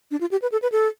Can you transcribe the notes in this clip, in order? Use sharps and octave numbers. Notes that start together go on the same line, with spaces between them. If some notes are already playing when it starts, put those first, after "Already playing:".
D4
F4
G4
B4
A4
B4
A4